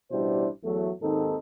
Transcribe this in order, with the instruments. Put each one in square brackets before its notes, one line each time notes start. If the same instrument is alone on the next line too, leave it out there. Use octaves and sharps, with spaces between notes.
[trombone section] A1 B2 G3 D4 E4 C5
E2 F#3 A3
D#2 G#2 D#3 C4 D#4 A4